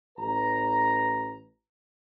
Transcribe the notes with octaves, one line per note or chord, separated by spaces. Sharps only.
A1 B4 A#5